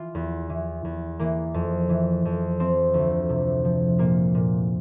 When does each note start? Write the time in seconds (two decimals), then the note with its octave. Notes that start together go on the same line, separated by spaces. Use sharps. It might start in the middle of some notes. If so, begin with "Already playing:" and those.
Already playing: E3 F4
0.15 E2
0.50 E3
0.85 E2
1.19 E3 A#3
1.54 F2
1.89 E3
2.25 F2
2.60 F3 C4
2.94 D2
3.29 C3
3.65 F3
3.98 A#2 A#3
4.35 A#2